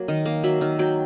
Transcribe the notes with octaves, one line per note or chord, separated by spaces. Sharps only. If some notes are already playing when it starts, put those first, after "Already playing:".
Already playing: F#3 A#3
D#3 D#5
A#3
F#3 E5
D#3
F#3 G5